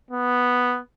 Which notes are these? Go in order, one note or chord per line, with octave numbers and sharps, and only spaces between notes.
B3